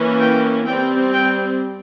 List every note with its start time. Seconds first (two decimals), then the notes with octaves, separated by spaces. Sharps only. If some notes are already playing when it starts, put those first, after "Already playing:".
Already playing: E3 A#3 C#4
0.21 G5
0.67 G3 C4 G5
1.12 G5